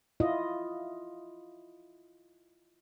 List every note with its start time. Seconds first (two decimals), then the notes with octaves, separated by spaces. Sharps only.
0.20 E4 F4 D#5